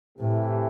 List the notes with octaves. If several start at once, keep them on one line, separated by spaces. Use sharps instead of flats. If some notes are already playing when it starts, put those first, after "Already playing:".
A2 C3 E3 A3 E4 G4